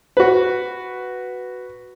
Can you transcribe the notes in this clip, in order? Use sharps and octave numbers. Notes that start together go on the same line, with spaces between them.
F#4 B4